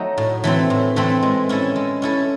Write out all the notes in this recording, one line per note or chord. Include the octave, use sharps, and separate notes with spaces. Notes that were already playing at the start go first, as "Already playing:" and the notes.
Already playing: F#3 A3 D#4
A2
E3 A3 C4
A2
E3 A3 C4
G#3
C#4 E4 A4
G#3
C#4 E4 A4